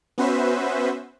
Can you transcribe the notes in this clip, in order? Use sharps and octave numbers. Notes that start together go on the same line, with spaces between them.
B3 C#4 F#4 B4 C5 E5